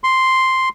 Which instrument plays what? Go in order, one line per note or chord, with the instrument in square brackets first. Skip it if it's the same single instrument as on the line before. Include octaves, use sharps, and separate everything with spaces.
[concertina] C6